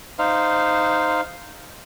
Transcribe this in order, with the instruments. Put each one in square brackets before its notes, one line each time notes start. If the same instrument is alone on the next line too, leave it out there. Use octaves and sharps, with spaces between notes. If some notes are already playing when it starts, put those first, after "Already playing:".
[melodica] D#4 C5 F5